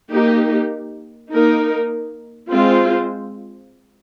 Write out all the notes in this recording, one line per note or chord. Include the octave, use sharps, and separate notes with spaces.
A#3 D#4 G4
A#3 D#4 A#4
G#3 C4 F4 C5